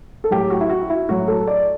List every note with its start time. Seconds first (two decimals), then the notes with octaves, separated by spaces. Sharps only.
0.24 A4
0.31 A2 F#3 G4
0.50 F#4
0.61 E4
0.69 F#4
0.90 E4
1.09 A2 F#3 F#4
1.28 A4
1.48 D5